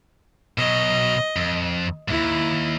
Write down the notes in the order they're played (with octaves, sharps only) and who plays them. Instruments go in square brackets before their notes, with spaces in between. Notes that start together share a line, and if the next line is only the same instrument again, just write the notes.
[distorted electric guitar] B2 F#3 [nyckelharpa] D#5
[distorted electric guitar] F2
[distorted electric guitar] D#2 G#2 [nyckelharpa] E4